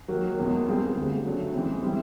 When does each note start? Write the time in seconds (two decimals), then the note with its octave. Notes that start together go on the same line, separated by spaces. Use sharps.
0.08 D#3 F#3 A#3
0.37 E2 B2 G#3 C#4
0.67 G3 C4 F4 G#4
0.95 D2 D3 G3
1.25 C#3 F#3 A3 D4
1.54 E3 G#3 C4
1.83 G3 C4 E4